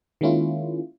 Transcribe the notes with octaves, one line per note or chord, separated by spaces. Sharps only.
D#3 G#3 A#3 C#4 E4 F4